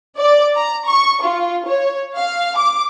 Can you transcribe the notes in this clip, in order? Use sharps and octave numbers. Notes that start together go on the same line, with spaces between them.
D5
A#5
C#6
F4
C#5
F5
D6